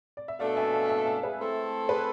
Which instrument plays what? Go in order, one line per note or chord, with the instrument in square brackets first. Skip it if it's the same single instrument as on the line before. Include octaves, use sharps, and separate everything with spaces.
[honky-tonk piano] D5
E5
[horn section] B2 A3 D4 A4 [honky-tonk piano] D5 F5
[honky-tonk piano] E5 G#5
F5 A5
E5 G#5
F5 A5
G#4 B4
[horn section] A3 C4 E4 A4
[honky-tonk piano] G#4 B4